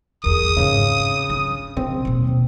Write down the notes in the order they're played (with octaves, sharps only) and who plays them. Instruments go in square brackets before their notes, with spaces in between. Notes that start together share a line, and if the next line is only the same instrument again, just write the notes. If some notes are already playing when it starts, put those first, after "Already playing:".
[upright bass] G1 E2 [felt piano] G#4 A#4 [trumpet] D#6
[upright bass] G#2 C4 [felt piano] C#3
[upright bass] D4
[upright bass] C#3 [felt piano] C4
[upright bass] D#2 B2